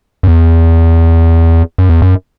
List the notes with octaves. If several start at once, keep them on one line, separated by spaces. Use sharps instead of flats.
F#2
E2
F#2
E2
F#2